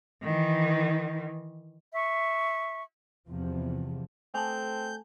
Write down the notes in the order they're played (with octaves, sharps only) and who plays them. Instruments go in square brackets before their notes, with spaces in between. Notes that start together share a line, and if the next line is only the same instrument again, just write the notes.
[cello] D#3 E3
[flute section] E5 C#6
[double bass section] E2 C3 F3
[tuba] A3 [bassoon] C4 [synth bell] G#5 A5 [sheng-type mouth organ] G6